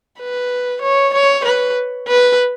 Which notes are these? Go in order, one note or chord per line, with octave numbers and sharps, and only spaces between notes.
B4
C#5
C#5
B4
B4